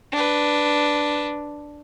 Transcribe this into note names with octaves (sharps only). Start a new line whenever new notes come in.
D4 B4